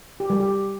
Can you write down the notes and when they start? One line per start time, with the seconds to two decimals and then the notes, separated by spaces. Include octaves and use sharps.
0.20 G4
0.30 G3
0.40 G4